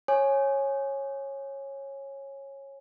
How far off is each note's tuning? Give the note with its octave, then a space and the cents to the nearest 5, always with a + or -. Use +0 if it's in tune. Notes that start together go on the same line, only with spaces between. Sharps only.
C#5 -15 G#5 +0 D6 +40